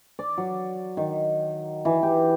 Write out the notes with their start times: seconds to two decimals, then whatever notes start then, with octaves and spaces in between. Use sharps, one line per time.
0.19 D5
0.38 F#3
0.97 D#3
1.85 E3
2.03 G4